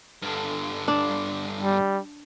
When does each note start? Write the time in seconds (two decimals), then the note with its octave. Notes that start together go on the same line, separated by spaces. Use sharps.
0.22 G2 D3
0.88 D4
1.62 G3